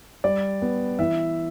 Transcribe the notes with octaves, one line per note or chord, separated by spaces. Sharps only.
G3 D5
B3
E3 E5